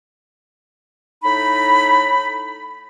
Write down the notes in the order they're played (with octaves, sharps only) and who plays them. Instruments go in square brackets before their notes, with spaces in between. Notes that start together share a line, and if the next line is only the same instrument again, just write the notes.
[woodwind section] A2 D#4 B5